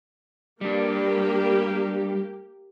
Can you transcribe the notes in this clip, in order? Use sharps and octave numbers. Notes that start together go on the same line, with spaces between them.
G3 A#3 D4 G4